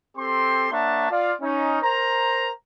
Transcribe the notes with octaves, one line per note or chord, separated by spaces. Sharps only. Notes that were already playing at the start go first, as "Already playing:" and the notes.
C4 G4 A4 C6
A#3 D4 C#5 E5 F#5 A5
F4 D5 F5
C#4 D#4
A#4 C5 A#5